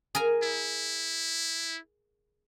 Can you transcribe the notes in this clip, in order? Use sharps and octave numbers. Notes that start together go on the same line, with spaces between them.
G#4 A#4 G#5
E4